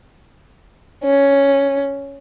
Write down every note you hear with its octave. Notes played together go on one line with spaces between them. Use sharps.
C#4